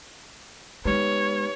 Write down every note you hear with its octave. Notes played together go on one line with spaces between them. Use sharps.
G#3 B3 D#4 G4 B4 C#5